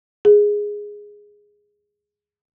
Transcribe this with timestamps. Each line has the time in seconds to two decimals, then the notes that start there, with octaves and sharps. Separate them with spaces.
0.25 G#4